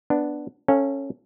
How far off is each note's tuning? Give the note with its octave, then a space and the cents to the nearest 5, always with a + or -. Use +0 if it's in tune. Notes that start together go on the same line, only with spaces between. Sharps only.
B3 +0 D4 +0
C#4 -10 A4 +10 F5 -5